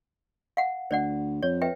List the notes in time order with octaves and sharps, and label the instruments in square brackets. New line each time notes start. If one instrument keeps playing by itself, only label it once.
[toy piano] F5 F#5
[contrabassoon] D2 [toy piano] C5 D5 F#5
[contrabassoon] F2 [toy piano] C#5
[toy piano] B4 E5 G5